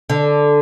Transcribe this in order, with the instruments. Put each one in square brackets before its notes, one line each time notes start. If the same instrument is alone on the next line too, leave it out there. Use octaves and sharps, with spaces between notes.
[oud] D3